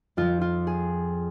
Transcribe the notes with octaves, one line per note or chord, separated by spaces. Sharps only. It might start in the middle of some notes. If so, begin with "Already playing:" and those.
F2 F3 F4
F4
G#4